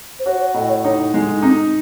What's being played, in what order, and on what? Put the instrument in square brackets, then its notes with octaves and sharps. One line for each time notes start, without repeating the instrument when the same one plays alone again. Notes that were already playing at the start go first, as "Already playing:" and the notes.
[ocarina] C5
[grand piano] F#4 [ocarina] C#5
[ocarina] C#5
[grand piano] A2 [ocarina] D#5
[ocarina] D#5
C#5
[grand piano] D#4 [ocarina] C#5
[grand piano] G#3 [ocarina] D#4
[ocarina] C4 [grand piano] D#4